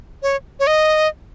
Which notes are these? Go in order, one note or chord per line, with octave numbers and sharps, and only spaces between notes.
C#5
C#5
D#5